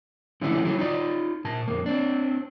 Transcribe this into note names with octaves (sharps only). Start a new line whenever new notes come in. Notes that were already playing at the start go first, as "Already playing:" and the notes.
D3 F3 A3 C#4 D4 E4
F#3 E4
D#4 F4 D5
A#2 A5
F2 A#3
C4 D4